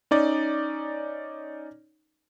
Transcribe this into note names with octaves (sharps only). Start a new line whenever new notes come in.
C#4 D#4 D5